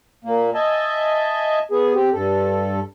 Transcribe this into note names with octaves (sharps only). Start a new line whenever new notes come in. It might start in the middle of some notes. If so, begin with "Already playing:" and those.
A#2 A#3
D#5 E5 G#5 A5
B3 G#4
C4 G4
G2 A4